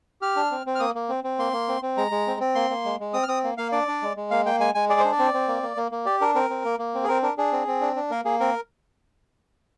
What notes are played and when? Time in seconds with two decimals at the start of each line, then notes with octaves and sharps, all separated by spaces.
0.22 G4 F6
0.36 D4
0.51 C4
0.66 C4
0.75 F6
0.80 A#3 D#6
0.95 A#3
1.09 C4
1.24 C4
1.39 A#3 C6
1.53 A#3
1.68 C4
1.82 C4
1.97 G#3 A#5
2.11 G#3
2.27 C4
2.40 C4
2.55 A#3 C6
2.70 A#3
2.85 G#3
3.00 G#3
3.13 C4 D#6
3.23 F6
3.28 C4 D#6
3.44 A#3
3.58 A#3 F5
3.72 D4 D5
3.88 D4
4.02 G#3
4.17 G#3
4.31 A#3 F5
4.46 A#3 G5
4.60 G#3 G#5
4.75 G#3 G#5
4.89 G#4 D5
5.00 D4 C5
5.12 D5
5.19 C4
5.34 C4
5.48 A#3
5.63 A#3
5.77 A#3
5.92 A#3
6.06 G4 D5
6.21 D4 A#4
6.35 C4 A#4
6.50 C4
6.65 A#3
6.79 A#3
6.94 C4
7.04 G#4
7.08 C4 A#4
7.23 D4 A#4
7.38 D4 G#4
7.52 C4
7.67 C4
7.81 D4
7.96 D4
8.11 A#3 A#4
8.25 A#3 G#4
8.40 C4 A#4